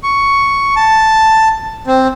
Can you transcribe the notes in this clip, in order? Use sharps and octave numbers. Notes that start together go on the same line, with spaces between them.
C#6
A5
C4